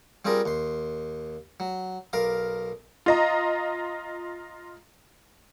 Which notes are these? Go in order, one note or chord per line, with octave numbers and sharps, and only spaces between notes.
G3 C4 F4 G#4 A#4
D#2 C6
F#3
B1 A#4 F5 D6
F4 D#5 A#5